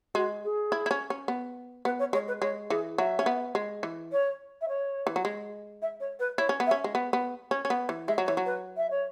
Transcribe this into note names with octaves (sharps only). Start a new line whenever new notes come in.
G#3 F#4
G#4
E4
E4
C#4
C#4
B3
B3 B4
C#5
G#3 C#5
B4
G#3 C#5
E3 G#4
F#3 E5
C#4
B3
G#3
E3
C#5
E5
C#5
E3
F#3
G#3
E5
C#5
B4
E4 C#5
C#4
B3
E5
C#4
G#3
B3
B3
C#4
C#4
B3
E3
G#3 E5
F#3
E3 C#5
F#3
B4
E5
C#5